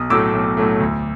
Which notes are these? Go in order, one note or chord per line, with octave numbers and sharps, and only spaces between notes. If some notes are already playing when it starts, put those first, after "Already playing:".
Already playing: B1 D#6
A2 F#3 A3 D6 E6
B1
A2 F#3 A3
D2